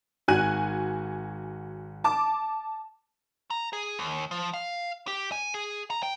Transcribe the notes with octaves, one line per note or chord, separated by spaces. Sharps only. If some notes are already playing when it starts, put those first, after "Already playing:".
G#1 F#4 G#5 F#6 D#7
A5 D6
A#5
G#4
D#2
F3
F5
G4
G#5
G#4
A#5
G5